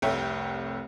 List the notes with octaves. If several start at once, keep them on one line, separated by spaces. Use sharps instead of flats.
F1 C2 A3 C#5 E5 G5